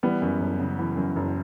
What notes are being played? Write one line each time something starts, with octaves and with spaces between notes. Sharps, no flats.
E3 G3 B3
F#2
F#1
C#3
E3
F#2
F#1